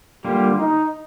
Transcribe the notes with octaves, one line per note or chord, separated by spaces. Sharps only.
D3 G3 A#3 F4 G4
D#4